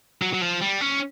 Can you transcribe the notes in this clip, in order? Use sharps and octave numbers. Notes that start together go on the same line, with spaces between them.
F#3
F#3
F3
G3
C#4